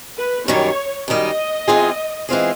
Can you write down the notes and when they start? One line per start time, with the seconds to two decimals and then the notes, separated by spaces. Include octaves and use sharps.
0.17 B4
0.47 F#2 D#3 G3 C#5
1.08 F#2 D#3 G3 D#5
1.68 E3 G#3 C4 F4 G#4
2.29 E3 G#3 C4 F4 G#4